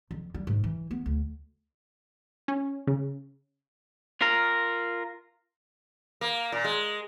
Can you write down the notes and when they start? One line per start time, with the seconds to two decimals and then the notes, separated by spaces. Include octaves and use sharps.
0.11 F2
0.34 G3
0.47 G#2
0.64 E3
0.91 B3
1.06 D2
2.48 C#4
2.87 C#3
4.21 F4 A#4
6.21 A#3
6.52 A#2
6.64 G#3